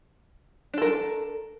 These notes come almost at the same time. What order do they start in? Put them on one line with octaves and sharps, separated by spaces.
D4 A4 A#4